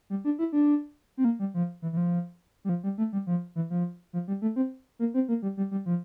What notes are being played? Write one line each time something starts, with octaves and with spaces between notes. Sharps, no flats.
G3
D4
E4
D4
C4
A#3
G3
F3
E3
E3
F3
G3
F3
G3
A3
G3
F3
E3
F3
F3
G3
A3
C4
A#3
C4
A#3
G3
G3
G3
F3